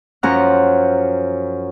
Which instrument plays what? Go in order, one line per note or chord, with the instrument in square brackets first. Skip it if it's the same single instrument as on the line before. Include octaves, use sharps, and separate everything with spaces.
[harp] F#2 F3 C#4 F#5 A#5 F#6